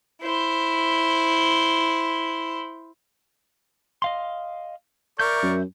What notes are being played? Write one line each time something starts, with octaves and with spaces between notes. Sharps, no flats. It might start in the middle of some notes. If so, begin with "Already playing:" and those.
E4 C5
D#5 F5 C6
A#4 D5 E5 C#6 G6
F#2